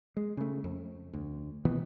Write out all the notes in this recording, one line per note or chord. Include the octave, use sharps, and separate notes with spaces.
G#3
C#3 A3
F2
D2
B2 D#3 E3 B3